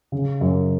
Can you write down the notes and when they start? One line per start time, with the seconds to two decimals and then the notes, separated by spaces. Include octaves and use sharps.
0.12 C#3
0.41 F#2